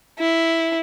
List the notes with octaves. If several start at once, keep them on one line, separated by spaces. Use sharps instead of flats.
E4